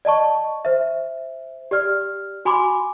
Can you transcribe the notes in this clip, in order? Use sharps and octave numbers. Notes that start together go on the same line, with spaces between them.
D5 D#5 A5 C#6
C5 E5
G4 D5 F6
F#4 G#5 B5 C6 D6